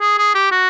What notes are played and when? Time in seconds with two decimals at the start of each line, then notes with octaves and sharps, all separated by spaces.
0.01 G#4
0.18 G#4
0.35 G4
0.52 F#4